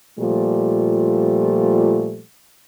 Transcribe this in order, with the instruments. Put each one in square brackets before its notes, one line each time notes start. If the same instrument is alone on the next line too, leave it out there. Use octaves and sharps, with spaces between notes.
[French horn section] A#2 F3 G3 A3